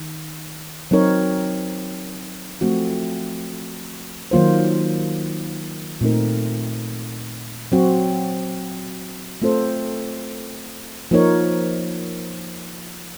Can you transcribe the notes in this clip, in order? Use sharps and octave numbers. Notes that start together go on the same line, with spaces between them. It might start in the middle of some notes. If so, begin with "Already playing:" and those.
Already playing: D#3
F#3 C4 D#4 A#4 C#5
F3 A3 C4 F#4
D#3 F#3 A#3 F4 C5
A#2 A3 C4 D#4 A#4
F#3 C4 F#4
A3 C4 F4 A4 C5
F3 A#3 D#4 A#4 C#5